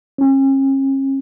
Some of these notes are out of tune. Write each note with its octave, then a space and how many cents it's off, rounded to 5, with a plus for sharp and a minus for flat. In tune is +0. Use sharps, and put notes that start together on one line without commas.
C#4 -40